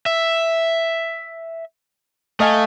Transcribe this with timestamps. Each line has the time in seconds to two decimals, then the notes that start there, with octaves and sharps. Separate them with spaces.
0.06 E5
2.40 A3 D#5 F5 G#5